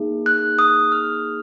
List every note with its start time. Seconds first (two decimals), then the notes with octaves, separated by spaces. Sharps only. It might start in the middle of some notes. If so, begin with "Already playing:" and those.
Already playing: A#3 D#4 G#4
0.26 F#6
0.59 D#6
0.92 F6